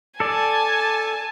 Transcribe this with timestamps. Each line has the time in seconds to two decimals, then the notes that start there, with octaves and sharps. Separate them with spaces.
0.20 A4 D5 G#5 A5